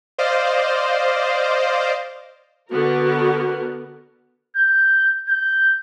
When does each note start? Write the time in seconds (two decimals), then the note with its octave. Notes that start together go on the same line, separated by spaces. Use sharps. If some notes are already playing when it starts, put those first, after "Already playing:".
0.18 C5 D5 D#5 F5
2.71 D3 B3 F#4 A#4
4.56 G6
5.28 G6